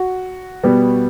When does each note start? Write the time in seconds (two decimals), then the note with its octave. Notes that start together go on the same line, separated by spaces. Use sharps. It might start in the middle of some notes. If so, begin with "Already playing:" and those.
Already playing: F#4
0.63 B2 G3 B3